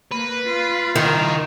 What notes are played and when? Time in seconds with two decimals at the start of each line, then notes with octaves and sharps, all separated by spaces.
0.12 A#3 B4
0.46 F4
0.95 D#3 E4 A#4